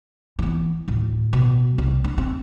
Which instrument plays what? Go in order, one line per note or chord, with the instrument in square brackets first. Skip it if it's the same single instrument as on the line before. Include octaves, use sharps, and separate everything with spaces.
[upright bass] E3 B3
D2 A2
B2
C2
D4
C4